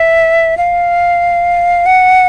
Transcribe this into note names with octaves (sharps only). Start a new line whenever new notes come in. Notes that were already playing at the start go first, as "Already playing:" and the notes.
Already playing: E5
F5
F#5